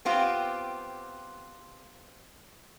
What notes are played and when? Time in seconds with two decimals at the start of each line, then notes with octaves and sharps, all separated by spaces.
0.05 B3 C4 F4 G4